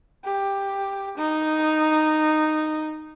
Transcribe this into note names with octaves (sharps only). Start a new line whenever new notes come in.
G4
D#4